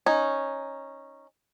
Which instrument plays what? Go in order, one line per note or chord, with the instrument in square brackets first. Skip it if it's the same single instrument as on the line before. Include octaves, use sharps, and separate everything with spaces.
[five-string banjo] C#4 D#4